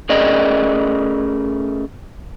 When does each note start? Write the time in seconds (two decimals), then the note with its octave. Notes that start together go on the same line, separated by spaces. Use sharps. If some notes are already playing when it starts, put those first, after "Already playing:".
0.09 A3 C#4 G#4 A#4 D5 D#5